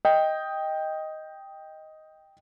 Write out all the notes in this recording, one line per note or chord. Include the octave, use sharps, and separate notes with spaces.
D#5 G5